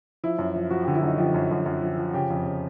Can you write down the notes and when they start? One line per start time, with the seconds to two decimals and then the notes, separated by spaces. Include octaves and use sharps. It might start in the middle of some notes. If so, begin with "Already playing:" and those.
0.23 F3 E4
0.39 F#2
0.56 F3
0.71 F3 F#4
0.83 D3 G4
0.95 E4
1.03 F#2 D#4
1.18 F3 G4
1.34 F#2
1.51 F#2
1.66 F#2
1.82 F3
1.97 F3
2.14 C#3 G4
2.30 F2
2.46 C#3